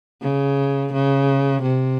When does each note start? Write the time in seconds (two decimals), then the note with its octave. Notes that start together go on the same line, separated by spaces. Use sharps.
0.22 C#3
0.93 C#3
1.62 C3